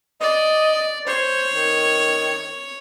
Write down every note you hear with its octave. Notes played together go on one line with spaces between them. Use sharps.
D5 D#5
C5 C#5
D#3